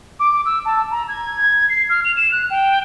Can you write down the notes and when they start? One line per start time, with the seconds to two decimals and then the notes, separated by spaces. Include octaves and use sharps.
0.19 D6
0.45 E6
0.65 A5
0.91 A#5
1.08 G#6
1.69 C7
1.89 F6
2.04 F7
2.16 E7
2.32 F#6
2.50 G5